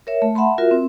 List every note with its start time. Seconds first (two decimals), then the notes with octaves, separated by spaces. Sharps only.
0.07 A#4 C#5 E5
0.22 A3
0.35 E5 F#5 A5 B5 C6
0.58 F4 F#4 A#4 E5
0.71 C4